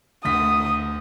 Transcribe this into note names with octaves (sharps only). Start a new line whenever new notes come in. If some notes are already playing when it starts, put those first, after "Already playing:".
D2 D#6 B6